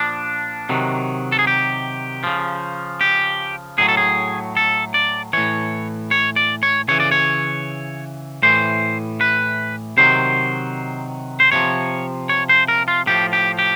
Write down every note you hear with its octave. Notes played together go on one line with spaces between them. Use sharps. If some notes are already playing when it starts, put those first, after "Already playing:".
Already playing: A#2 F3 D4
C3 D#3 F#3
A4
G#4
G4
C#3 F3
G4
A2 F#3 G#4
A4
G#4
A4
D5
A2 E3 C#5
C#5
D5
C#5
C#3 E3 C#5
D5
C#5
A2 E3 C5
B4
C3 D#3 F#3 C5
C5
C3 F3 C#5
C#5
C5
A#4
F4
A2 F3 G4
G4
G4